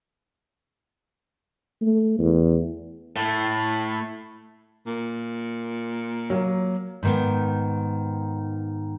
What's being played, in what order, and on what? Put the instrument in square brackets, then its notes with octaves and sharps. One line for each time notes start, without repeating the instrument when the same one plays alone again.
[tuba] A3
E2
[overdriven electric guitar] A2 A3
[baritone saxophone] A#2
[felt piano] F#3 A#3
[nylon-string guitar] G#2 D#3 B3